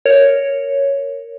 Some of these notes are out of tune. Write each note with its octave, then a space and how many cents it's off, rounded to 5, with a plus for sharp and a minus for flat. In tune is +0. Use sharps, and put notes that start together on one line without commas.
A#4 +0 C#5 +0